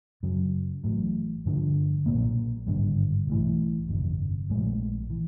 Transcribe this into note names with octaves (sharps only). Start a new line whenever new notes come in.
F#2 C#3 F#3
A1 A2 F#3
G2 D3 F3
B1 A#2 F3 A#3
G#1 G2 D3 G3
B1 A2 E3
G1 F2 C3
A#1 A2 F3 G#3
E3